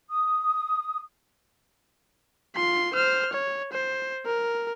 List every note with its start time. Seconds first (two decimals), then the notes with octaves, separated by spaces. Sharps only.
0.09 D#6
2.56 F4 C6
2.94 C5 F6
3.33 C#5
3.73 C5
4.26 A#4